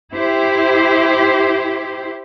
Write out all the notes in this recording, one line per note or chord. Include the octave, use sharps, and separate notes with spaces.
E4 G4 C5